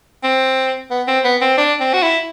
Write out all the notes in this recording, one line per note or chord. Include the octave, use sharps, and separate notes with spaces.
C4
B3
C4
B3
C4
D4
C4
F#4
E4